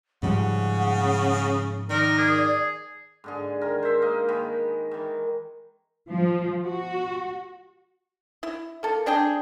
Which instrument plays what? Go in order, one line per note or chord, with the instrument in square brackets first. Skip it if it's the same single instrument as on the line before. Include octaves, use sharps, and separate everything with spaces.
[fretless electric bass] G#2 F3 G3 [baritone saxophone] C#3 [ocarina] F#5
[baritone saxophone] D#3 [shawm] A#4 [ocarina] D5
[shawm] G#4
[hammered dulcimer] G#2 D3 G#4
D#3 A#4
C5 E5
A#3 D#4
D#3 G#3 B5
D#3 E3
[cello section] F3
F#4
[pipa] E4
A#3 A4
C4 D4 G#4 G5